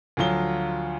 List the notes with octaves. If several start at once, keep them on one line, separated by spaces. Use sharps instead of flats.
D2 F3 F#3 F4 G7